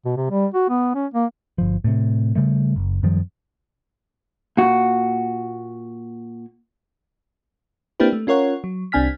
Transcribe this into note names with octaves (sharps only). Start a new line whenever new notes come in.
B2
C3
G3
F#4
B3
C#4
A#3
G1 F3
A2 C3
C#3 G3 A3
F#1
F#2 D#3 F3 G3
A#2 F#4
A#3 C4 D4 E4 G4 B4
A3
C#4 F4 A#4 C#5 F#5
F#3
C2 C4 D4 G#5 F6 B6